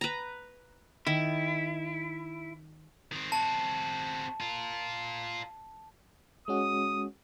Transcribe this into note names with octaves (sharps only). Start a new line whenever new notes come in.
B4 A#5
D#3 E4
D#3 C4
C4 F#4 A5
F4 A#4
G#3 C#4 F#4 D#6